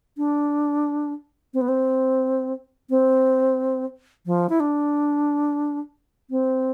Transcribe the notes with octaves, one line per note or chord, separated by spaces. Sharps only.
D4
C4
B3
C4
C4
F3
E4
D4
C4